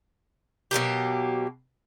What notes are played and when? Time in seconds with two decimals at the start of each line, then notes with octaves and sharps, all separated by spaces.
0.71 B2 F#3 A#3 G4